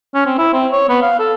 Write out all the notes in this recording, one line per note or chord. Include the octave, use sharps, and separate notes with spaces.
C#4
C4
E4
C4
C#5
B3
F5
A4